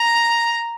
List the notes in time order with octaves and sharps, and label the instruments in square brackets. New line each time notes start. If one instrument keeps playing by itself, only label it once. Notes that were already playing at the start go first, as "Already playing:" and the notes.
Already playing: [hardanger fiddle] A#5